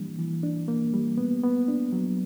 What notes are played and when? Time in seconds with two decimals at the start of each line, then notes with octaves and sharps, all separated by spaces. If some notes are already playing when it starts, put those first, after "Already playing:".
Already playing: E3 G3 A#3 D4
0.19 E3
0.43 D4
0.68 A#3
0.94 G3
1.18 B3
1.43 B3
1.68 D4
1.92 F#3